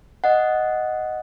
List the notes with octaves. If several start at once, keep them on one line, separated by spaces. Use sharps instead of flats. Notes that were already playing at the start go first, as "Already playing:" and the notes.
D#5 F#5